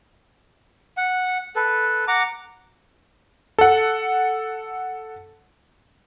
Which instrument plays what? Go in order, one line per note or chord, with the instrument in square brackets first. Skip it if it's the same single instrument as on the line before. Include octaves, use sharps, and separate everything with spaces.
[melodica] F#5
A4 B4
F#5 A#5 D6
[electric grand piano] A4 F#5